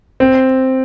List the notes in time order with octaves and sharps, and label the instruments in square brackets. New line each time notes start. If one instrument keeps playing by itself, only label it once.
[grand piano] C4